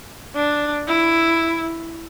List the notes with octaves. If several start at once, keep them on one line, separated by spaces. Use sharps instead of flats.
D4
E4